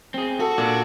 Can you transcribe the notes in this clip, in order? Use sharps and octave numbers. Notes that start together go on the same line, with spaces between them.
C4 G#4
F#4 A4
A#2 D4